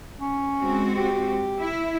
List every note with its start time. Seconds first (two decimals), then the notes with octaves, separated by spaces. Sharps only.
0.21 C#4
0.59 G#3 C4 F#4
0.97 G4
1.59 E4